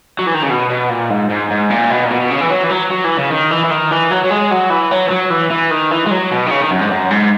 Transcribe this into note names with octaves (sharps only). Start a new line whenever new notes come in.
F#3
E3
D#3
C#3
B2
B2
A#2
G#2
G#2
G#2
A#2
B2
A#2
B2
B2
C#3
E3
F#3
E3
F#3
F#3
E3
C#3
D#3
E3
E3
D#3
E3
F#3
F#3
G#3
F#3
E3
F#3
E3
F#3
E3
E3
D#3
E3
G#3
F#3
B2
D#3
C#3
D#3
F#2
G#2
F#2
G#2